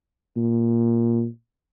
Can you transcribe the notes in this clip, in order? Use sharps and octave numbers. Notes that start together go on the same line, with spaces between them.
A#2